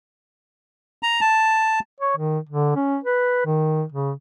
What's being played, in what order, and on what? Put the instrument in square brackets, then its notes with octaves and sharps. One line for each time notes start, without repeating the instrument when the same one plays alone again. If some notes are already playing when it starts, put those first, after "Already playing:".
[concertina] A#5
A5
[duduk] C#5
D#3
D3
C#4
B4
D#3
C#3